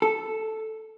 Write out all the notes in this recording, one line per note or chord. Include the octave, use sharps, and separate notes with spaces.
A4